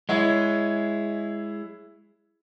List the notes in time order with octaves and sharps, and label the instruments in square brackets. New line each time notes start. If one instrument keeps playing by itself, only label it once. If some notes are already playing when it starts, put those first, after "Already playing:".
[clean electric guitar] G#3 [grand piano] E4 C#5 E5